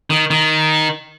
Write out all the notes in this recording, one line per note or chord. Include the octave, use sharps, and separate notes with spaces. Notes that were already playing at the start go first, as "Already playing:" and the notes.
D#3
D#3